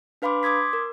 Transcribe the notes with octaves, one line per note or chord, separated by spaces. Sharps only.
D4 B4 F5 B5 C6 D6
C6 D6 D#6 G#6 B6
A#4